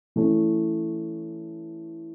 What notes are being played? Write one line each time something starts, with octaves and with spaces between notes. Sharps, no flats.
E3 A3 C#4